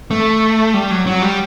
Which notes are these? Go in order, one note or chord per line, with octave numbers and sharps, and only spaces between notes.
A3
G3
F#3
F#3
G3